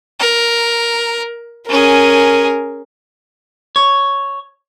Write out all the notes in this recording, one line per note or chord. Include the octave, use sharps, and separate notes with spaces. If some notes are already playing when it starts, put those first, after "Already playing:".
A#4
C#4 G#4 A#4
C#5